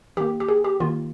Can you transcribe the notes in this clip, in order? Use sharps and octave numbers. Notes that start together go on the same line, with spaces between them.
D#3 A#3 G4
G4
G#4
G4
D#3 A#3 F4